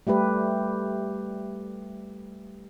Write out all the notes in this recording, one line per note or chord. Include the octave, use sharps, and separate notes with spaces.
G3 A3 G4 B4